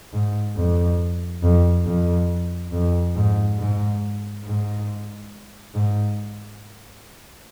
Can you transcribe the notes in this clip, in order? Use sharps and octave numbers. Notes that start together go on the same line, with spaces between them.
G#2
F2
F2
F2
F2
G#2
G#2
G#2
G#2